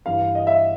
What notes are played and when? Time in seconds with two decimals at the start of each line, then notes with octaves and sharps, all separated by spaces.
0.06 G2 E3 F5
0.35 D#5
0.47 E5